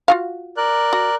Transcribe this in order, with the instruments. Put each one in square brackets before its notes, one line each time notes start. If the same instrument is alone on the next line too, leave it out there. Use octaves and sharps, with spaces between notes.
[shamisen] F4 F#4 F5
[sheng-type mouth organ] A#4 D5 F#6
[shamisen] F#4